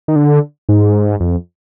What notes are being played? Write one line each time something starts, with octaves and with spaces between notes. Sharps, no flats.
D#3
D3
G#2
F2